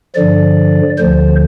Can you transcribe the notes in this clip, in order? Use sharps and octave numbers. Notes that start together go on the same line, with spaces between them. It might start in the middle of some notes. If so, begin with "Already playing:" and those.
G2 D3 F3 D5
D2 D3 F3 C5